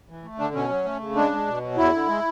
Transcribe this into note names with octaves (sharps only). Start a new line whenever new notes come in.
E3
A3
D3 D4
B2 C#4
F#3
A3
C#3
G#3 D4
G#3
B2
F#3
E2 E4
D3
G#3